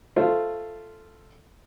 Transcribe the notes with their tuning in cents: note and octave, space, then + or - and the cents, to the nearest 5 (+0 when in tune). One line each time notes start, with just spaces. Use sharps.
A3 +0 F4 -10 C5 +0